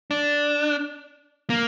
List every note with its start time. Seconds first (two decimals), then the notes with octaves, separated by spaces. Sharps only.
0.11 D4
1.50 A#3